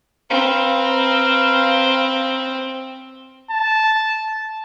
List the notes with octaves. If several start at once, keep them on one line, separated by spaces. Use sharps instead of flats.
C4 B4 F5 A#5
A5